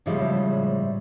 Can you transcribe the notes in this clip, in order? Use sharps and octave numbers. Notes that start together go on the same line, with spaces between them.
A2 C#3 F3 G3 G#3 E5